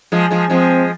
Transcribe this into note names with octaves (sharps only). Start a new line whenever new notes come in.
F3 G#3
F3 G#3
F3 G#3 C4